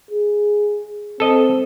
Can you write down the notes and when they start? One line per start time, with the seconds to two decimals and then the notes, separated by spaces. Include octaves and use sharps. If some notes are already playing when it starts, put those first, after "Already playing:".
0.11 G#4
1.20 C4 A4 D#5